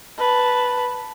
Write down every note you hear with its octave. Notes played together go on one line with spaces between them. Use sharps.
B4 A5